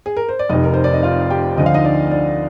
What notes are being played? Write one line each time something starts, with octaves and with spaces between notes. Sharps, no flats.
G#4
A#4
C5
D5
F1 F2 C3 D#4 D#5
A#4
C5
D5
D#5
F4 F5
G4 G5
D2 D3 F3 D#5
F5
D#4 D#5
D4 D5
D4 D5